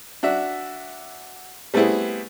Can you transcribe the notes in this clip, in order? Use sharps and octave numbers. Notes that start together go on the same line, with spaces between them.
D4 F#4 E5
G3 A3 B3 C4 E4 G#4